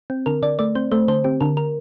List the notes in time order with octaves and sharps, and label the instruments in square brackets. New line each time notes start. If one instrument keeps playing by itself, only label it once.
[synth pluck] C4
D3 A#4
D3 D5
A3 D5
C4 C5
A3 C5
D3 C5
C4 G4
D3 A#4
A#4